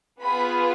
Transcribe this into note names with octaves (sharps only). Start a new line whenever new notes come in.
B3 F4 G#4 B5